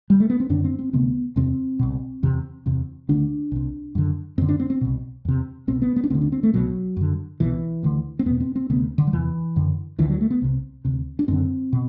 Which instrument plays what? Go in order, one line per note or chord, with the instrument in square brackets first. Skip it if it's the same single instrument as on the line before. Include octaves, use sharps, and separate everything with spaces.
[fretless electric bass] G3
A3
B3
C4
F#2 D3 D4
C4
C4
D2 C3 B3
E2 C3 C4
C2 B2
E2 C3
E2 C3
D2 D3 D4
C2 C3
F#2 D3
F#2 C4
D3
D4
C4
C4
C2 B2
E2 C3
C2 B2 C4
B3
B3
D4
D2 D3 C4
D4
C4
A3
C2 B2 F#3
F#2 D3
C2 B2 E3
D2 D3
C4
E2 B2 B3
C4
C4
D2 C3 B3
D3
F#3
E2 C3 E3
F#2 D3
D2 D3 E3
F#3
A3
B3
C2 C3
D2 C3
D4
F#2 D3 C4
B2